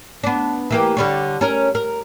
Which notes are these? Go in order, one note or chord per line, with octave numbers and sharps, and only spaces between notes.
B3 D4
E3 A#3 G4
D3 G3 C#5
C#4 A#4
A#4